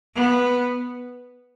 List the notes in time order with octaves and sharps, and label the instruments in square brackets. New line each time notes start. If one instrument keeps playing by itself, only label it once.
[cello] B3